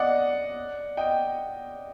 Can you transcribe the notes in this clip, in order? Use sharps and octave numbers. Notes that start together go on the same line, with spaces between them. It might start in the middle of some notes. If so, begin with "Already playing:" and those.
Already playing: D5 D#5 F#5
D#5 G5